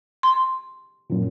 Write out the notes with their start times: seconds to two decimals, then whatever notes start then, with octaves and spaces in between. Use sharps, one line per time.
0.23 C6
1.10 F#2 A#2